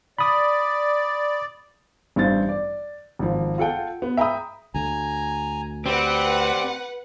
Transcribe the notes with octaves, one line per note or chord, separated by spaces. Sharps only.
D5 B5 D#6
A1 G2 C5 A6
D5
G#1 F3
F4 A4 F#5 G5
B3
E5 G5 A#5 B5 D#6
D2 A3 G#5 A#5
C4 G4 B4 D5 F#5